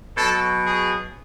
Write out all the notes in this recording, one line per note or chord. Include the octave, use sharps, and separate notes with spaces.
B2 F#3 A4
G#4